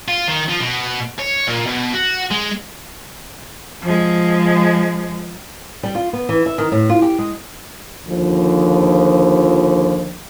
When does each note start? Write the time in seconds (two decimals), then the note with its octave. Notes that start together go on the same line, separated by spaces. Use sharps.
0.08 F4
0.28 D#3
0.48 F3
0.61 B2
1.19 C#5
1.47 A#2
1.66 B2
1.94 F#4
2.31 G#3
3.83 F3 G#3
5.83 G3
5.95 F4
6.13 B3
6.29 E3
6.46 E5
6.58 D#3
6.72 A2
6.90 F4
7.02 G4
7.19 G#3
8.07 D#2 D3 F3